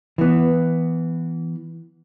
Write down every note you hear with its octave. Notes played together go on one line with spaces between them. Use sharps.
E3 B3